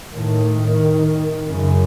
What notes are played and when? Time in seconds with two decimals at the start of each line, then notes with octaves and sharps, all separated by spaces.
0.15 A2 D#3
1.48 F#2 C#3